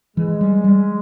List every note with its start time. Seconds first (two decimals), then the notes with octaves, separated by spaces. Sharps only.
0.17 E3 G#3
0.41 G3
0.64 G3